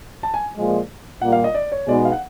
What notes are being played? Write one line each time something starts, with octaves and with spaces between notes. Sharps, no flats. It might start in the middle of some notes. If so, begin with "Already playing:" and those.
A5
G#5
A#2 F3 G#3
A#2 G3 A#3 F#5
F5
D#5
D5
C#5
B2 G#3 B3 D#4 G#4 D5
F5
F#5